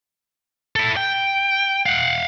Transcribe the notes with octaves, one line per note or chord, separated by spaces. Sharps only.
E4 A4
G5
F5 F#5